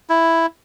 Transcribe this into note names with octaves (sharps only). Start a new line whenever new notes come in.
E4